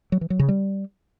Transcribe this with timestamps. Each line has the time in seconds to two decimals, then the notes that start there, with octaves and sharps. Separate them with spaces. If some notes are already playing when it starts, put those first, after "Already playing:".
0.12 F#3
0.21 E3
0.30 F#3
0.39 C#3
0.49 G3